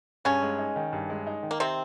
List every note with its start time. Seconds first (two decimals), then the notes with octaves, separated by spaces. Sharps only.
0.25 G2 C#3 C#4
0.42 G#3
0.59 D#4
0.76 D#3
0.92 G2
1.10 G#3
1.27 D#4
1.43 D#3
1.51 A#3
1.60 C3 C4